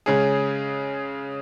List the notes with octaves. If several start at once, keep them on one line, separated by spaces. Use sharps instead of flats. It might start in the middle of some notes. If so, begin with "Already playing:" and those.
C#3 G#3 C#4 G#4